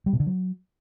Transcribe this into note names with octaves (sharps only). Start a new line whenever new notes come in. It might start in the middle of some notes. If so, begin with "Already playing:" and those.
G3
B2
D3
F#3